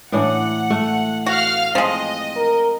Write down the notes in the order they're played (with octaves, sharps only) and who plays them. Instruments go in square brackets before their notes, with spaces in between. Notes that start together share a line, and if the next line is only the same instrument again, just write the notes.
[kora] A2 E3 D4 [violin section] F#5
[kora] A3
[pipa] F#4 [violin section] F5 F6
[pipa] F3 G#3 [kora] C4 [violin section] D#5
[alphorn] A#4